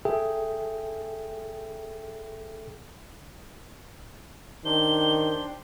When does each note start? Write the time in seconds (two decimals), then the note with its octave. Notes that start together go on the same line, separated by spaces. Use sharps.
0.05 G#4 A4 E5 G5
4.65 D#3 D4 G4 C5 G7